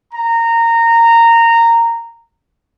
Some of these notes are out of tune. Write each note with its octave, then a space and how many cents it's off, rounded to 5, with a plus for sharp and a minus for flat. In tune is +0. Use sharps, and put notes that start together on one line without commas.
A#5 -15